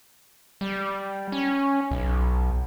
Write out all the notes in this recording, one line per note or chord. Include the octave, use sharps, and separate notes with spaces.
G3
C#4
B1